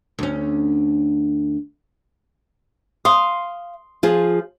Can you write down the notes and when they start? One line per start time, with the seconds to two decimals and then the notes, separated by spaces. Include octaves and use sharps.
0.19 D2 C#4
3.05 F5 C6 D#6
4.03 F3 F4 G#4